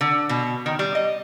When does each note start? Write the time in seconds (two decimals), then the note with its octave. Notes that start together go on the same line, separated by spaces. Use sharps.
0.01 D3
0.29 B2
0.66 D#3
0.79 G3
0.95 D#5